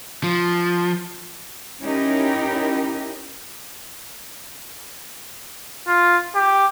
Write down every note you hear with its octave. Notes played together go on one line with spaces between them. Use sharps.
F3
C#4 D#4 E4 G4 A#4
F4
G4